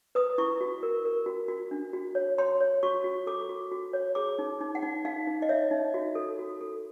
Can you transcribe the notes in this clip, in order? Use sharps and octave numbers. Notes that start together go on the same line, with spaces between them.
B4 D#6
E4 C#6
F#4
A#4
A#4
F#4
F#4
D4
F#4
C#5
C#5 C6
C#5
F#4 C#6
F#4
A4 D6
F#4
F#4
C#5
G#4 D6
D#4
D#4
F#5
D#4
D#4 F5
D#4
D#5
C#5 E5
D#4
F#4
A4
F#4
A4